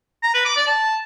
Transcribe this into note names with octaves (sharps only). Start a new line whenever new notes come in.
A#5
B4
D6
D5
A5